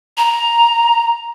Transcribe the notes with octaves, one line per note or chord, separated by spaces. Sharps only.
A#5